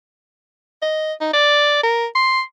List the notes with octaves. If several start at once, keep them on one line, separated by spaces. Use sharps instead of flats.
D#5
D#4
D5
A#4
C6